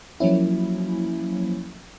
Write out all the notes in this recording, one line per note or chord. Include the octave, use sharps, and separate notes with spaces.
F3 F#3 A#3 C#4 E4